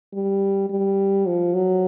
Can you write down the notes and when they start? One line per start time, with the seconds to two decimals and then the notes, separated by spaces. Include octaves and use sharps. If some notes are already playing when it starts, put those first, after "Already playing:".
0.13 G3
0.70 G3
1.27 F3
1.54 F#3